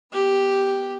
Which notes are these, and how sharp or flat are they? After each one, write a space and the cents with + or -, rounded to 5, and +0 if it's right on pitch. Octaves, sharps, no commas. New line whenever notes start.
B3 +0 G4 +0